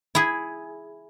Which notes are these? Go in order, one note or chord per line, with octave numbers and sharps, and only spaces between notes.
E4 G#4